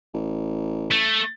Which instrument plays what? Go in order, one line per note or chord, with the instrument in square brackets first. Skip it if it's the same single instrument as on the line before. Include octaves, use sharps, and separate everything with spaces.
[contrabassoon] A1
[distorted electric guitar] A3